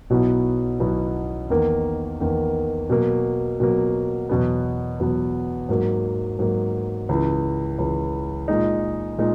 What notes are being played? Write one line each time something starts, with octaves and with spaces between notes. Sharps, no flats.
B1 B2 F#3 B3 E4
B1 B2 F#3 B3 E4
E2 D#3 A#3
E2 D#3 A#3
B2 F#3 A#3
B2 F#3 A#3
E2 B2 F#3 B3
E2 B2 F#3 B3
G#2 F#3 A#3
G#2 F#3 A#3
C#2 C#3 E3
C#2 C#3 E3
A#2 G#3 D#4
A#2 G#3 D#4